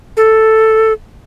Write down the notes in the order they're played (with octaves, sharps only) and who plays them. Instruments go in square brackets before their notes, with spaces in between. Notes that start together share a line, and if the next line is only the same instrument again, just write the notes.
[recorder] A4